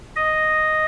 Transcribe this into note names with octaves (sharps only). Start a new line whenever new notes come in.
D#5